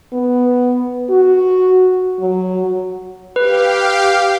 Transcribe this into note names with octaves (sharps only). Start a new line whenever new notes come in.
B3
F#4
F#3
G4 B4 F5